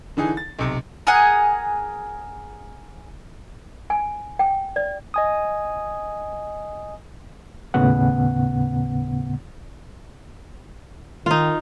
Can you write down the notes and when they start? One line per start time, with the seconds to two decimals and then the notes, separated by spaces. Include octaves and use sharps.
0.17 D3 E3 D#4 G#4
0.37 A6
0.59 B1 C3
1.07 G#4 A#4 F#5 G#5
3.90 G#5
4.39 G5
4.76 D5
5.14 D#5 G#5 D#6
7.74 D#2 A2 C#3 B3 F#5
11.26 D#3 D#4 F4